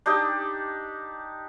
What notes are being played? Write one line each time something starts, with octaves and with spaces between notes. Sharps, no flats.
D4 D#4 G4 D#5